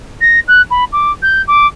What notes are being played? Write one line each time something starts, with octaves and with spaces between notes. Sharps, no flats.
A#6
F#6
B5
D6
G6
D6